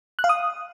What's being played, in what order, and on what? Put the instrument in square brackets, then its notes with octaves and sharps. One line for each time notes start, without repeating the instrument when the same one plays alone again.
[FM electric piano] F#6
F5
D#6